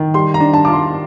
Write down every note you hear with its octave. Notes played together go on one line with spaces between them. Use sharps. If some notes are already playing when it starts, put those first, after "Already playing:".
Already playing: D#3
G3 C6
A#5
D4
A5
F4 D6
C6